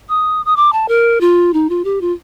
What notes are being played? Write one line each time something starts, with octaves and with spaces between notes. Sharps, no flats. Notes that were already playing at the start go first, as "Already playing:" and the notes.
D#6
D#6
D6
A5
A#4
F4
D#4
F4
G4
F4